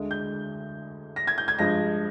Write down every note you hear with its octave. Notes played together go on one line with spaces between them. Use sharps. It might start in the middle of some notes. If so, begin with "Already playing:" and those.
Already playing: D2 D3 G#3
G6
A#6
G#6
G6
G#6
G2 F3 G#3 A#6